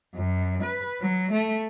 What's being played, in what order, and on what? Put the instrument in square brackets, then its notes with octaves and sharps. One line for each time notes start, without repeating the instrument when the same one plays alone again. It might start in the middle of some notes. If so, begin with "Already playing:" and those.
[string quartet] F#2
B4
F#3
A3